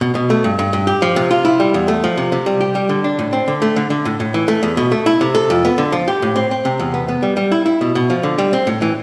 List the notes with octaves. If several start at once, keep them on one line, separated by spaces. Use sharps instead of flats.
B2
B2
A3
G2
G2
G2
G4
F3
C3
F4
E4
G3
E2
A3
F3
C3
C3
G3
G4
G3
D3
D4
A2
C4
D3
A3
D3
D3
A2
A2
E3
A3
E2
B2
A3
E4
C3
A4
F2
B3
D3
F3
G4
A2
C4
C4
C3
E2
B3
B3
G3
G3
E4
E4
B2
B2
F3
D3
G3
C4
A2
E3